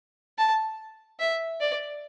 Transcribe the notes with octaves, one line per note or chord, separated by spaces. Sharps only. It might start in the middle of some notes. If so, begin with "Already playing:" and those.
A5
E5
D5